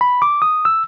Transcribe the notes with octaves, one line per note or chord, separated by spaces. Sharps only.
B5
D6
D#6
E6